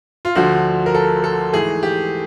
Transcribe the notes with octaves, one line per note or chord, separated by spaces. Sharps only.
F4
D2 D3 F3 F#4
A#4
A4
A4
G#2 E3 A3 G#4
G4